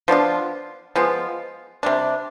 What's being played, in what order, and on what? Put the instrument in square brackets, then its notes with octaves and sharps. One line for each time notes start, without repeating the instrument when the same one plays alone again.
[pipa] F3 B3 D4 F4
F3 G#3 B3 F4
C3 G3 D4